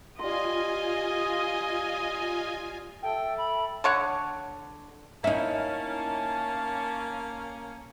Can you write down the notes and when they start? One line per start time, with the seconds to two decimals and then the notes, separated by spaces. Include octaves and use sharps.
0.19 G3 F4 D#5 G#5 C6
3.03 A4 E5 G5
3.38 B5
3.84 D3 C#5 F#5
5.24 A#3 C#4 D#4 E4 A5